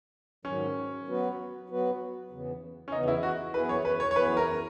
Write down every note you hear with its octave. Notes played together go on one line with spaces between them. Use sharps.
G#2 D#3 F#3 C#4
F#3 B3 F#4 B4
F#3 B3 F#4 B4
E2 C#3 E3 B3
C#4
E2 C#3 E3 B3 D#4
E4
F#4
F#2 E3 B3 E4 G#4 B4
C#5
B4
C#5
C#5
F#2 E3 B3 E4 G#4 B4
A#4